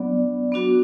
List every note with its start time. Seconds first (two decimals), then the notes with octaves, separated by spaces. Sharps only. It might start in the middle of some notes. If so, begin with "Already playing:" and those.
Already playing: F#3 B3 D4 D5
0.52 B3 D4 F#4